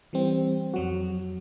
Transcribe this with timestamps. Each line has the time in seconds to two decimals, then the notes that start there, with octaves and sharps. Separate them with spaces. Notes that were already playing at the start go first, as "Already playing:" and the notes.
0.13 E3 G3 C4
0.74 F2 F#3 F#4